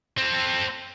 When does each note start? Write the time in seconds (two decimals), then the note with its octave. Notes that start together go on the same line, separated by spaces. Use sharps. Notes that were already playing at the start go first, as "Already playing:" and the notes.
0.18 C4 A4